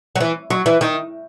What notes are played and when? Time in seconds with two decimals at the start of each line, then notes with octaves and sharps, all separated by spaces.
0.15 F#3
0.20 E3
0.50 F#3
0.66 E3
0.81 D#3